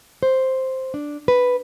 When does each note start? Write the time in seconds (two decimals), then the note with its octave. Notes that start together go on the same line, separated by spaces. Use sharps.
0.23 C5
0.94 D4
1.28 B4